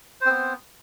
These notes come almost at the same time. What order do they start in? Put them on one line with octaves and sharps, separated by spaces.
C5 C4 B3